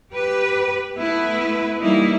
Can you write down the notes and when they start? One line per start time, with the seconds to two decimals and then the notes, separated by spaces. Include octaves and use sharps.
0.13 G4 B4
0.95 A3 B3 E4 B4
1.80 E3 G3 A#3 D#4 E4